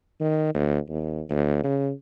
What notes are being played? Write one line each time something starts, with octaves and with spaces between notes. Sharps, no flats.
D#3
D2
D#2
D2
C#3